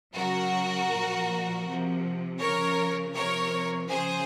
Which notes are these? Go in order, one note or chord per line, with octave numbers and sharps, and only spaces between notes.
C#3 F#3 F#4 A#4
A#2 F3
C3 F3
C#3 F3 A#4 C#5
C3 F3 A#4 C#5
C#3 F3 G#4 C5